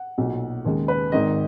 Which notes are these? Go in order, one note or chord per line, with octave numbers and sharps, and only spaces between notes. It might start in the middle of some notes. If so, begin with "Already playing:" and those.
Already playing: F#5
B1 A#2 F#3
D#2 C#3 G#3
B4
G#1 G#2 D#3 D#5